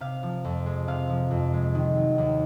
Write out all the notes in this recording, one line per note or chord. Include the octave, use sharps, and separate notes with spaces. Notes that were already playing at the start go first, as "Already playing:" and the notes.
C3 F5
F3
F2
G#3
C3 F5
F3
F2
G#3
D#3
F#3
D#2